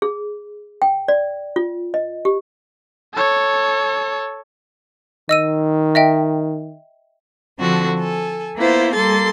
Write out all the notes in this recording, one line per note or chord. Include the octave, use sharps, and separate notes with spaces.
G#4
G5
D5
F4
D#5
G4
A4 C#5
D#3 D#5 E6 D#7
D#5 E5 G5
D3 F3 C4 F#4 A4
A4 G#5
A#3 B3 E4 F4 C5
G3 A#3 A4 C6 A6